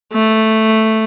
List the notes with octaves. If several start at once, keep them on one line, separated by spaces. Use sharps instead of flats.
A3